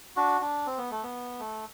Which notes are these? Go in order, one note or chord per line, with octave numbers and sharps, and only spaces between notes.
D4 F#4
D4
C4
B3
A3
B3
A3